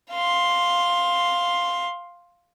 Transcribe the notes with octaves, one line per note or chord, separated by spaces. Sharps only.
F5 C6